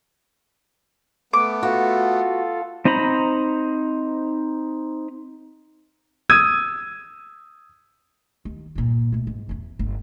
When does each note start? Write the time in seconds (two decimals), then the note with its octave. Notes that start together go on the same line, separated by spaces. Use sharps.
1.33 A3 B3 D6
1.63 F4 F#4 A4
2.85 C4 D#4 C5 A#5 B5
6.29 D#6 E6 G#6 D#7
8.45 D#2
8.75 G2 A#2
9.12 B2 A3
9.27 G#2
9.49 E2 C#4
9.79 G1